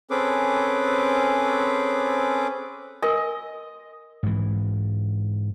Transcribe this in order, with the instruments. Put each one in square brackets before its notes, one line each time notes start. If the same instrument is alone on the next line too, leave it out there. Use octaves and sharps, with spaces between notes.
[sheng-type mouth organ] C4 C#4 G#4 A4 B4 D6
[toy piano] A#4 G#5 [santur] D#5
[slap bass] G#2 E3